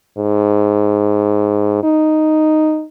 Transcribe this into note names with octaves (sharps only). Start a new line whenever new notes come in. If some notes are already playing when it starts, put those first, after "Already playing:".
G#2
D#4